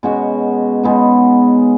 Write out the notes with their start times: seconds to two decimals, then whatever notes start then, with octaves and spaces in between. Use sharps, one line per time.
0.03 B2 G#3 C#4 F#4
0.83 B2 G#3 B3 D#4